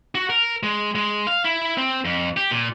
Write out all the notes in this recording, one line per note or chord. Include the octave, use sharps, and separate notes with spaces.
F#4
A#4
G#3
G#3
F5
E4
C4
F2
G4
A#2